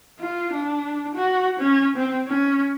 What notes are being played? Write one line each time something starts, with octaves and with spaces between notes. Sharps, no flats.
F4
D4
F#4
C#4
C4
C#4